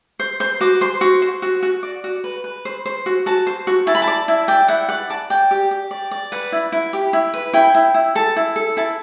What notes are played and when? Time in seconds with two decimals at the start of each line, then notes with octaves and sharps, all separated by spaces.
0.19 C5
0.40 C5 C6
0.61 F#4 D6
0.81 C5 C6
1.01 F#4
1.22 C5
1.42 F#4
1.63 F#4
1.83 D5
2.04 F#4
2.24 B4
2.44 B4
2.65 C5
2.86 C5
3.06 F#4
3.26 F#4 A5
3.47 C5
3.67 F#4
3.87 E4 A5
3.95 B5
4.02 A5
4.08 D5
4.28 E4
4.48 D5 G5
4.68 E4 F#5
4.88 D5 F#5
5.10 D5 A5
5.30 D5 G5
5.51 G4
5.71 G4
5.91 D5
6.11 D5
6.32 B4 F#5
6.52 E4
6.72 E4
6.93 G4
7.13 E4
7.34 B4
7.53 E4 G5
7.75 E4
7.94 E4
8.15 A4 A5
8.36 E4
8.56 A4
8.77 E4 A5